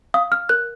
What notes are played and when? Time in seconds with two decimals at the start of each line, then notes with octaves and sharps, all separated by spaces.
0.14 F5 D#6
0.32 F6
0.49 A#4 F#6